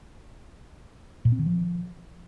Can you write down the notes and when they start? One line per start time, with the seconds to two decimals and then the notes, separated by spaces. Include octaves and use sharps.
1.25 A#2
1.32 C4
1.39 D#3
1.46 F3